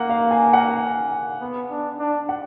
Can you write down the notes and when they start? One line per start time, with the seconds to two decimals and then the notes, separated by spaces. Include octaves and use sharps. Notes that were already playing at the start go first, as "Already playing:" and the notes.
Already playing: A#3 F#5
0.09 F5
0.31 G#5
0.53 F#5
1.41 B3
1.70 D4
1.99 D4
2.29 F#5